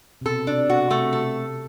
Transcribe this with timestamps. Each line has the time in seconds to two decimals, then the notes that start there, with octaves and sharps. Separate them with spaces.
0.21 C3
0.26 B2 A4
0.47 C3 D4
0.69 B2 F#4
0.90 C3 A3
1.13 C3 A4